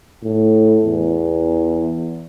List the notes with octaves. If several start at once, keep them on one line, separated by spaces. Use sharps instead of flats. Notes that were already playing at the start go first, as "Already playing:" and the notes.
A2
E2